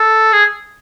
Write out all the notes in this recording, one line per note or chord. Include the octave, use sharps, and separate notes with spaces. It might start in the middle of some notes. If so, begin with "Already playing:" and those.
Already playing: A4
G#4